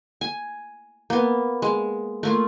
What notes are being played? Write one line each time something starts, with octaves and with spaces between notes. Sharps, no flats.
G#5
A#3 B3
G#3
A3 A#3 F4